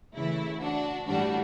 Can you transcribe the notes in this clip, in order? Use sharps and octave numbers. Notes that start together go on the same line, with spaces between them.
C#3 E3 A3 E4
D4 F#4
A2 E3 G3 D4 F#4